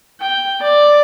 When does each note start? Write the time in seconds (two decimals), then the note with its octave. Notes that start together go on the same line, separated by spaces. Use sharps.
0.21 G5
0.62 D5